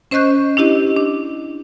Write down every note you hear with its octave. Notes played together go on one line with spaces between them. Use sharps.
C#4 C5 D#5 C#6 F#6 G6
D4 E4 G4 D#5
D4